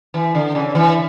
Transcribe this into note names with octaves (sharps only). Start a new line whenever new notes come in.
E3
D3
C#3
E3